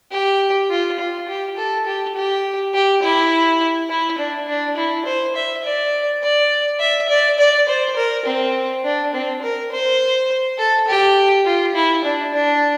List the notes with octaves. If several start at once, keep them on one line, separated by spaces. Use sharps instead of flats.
G4
F4
F4
G4
A4
G4
G4
G4
E4
E4
D4
D4
E4
C5
E5
D5
D5
E5
D5
D5
C5
A#4
C4
D4
C4
A#4
C5
A4
G4
F4
E4
D4
D4